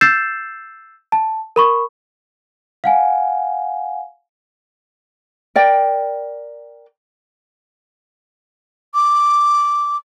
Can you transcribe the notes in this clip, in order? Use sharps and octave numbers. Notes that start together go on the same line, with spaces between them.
E6 G6 A6 C7 E7
A5
A#4 B5 C#6
F5 F#5 G#5
A#4 D5 G5
D6